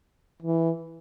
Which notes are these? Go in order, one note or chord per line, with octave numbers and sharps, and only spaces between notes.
E3